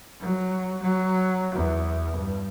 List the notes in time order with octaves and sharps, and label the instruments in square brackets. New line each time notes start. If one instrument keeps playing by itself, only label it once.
[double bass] F#3
F#3
E2
G2